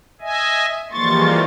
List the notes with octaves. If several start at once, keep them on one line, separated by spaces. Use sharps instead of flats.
D#5 E5 G#5
E3 F3 G3 G#3 A#3 C6 C#6 A6